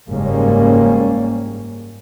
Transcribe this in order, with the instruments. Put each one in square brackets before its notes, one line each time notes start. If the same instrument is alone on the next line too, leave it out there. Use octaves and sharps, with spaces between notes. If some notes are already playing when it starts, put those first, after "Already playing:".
[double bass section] F#1 G#2 G3 A#3 C#4